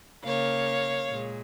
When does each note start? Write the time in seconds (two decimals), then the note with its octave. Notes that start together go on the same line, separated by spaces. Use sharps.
0.25 C#3 A#3 C#5 F5
1.10 A#2 G#3